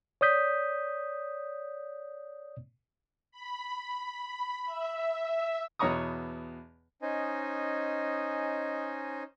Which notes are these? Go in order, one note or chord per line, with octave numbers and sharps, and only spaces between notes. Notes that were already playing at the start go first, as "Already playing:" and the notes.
C#5 D5 D#6 G6 B6
B5
E5
E2 B2 C#5 A#5 C#6 D#6
C#4 D#4 C5 D#5 G#5